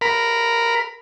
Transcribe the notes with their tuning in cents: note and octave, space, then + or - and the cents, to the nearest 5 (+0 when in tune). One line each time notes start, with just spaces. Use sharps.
A#4 +0 B5 +5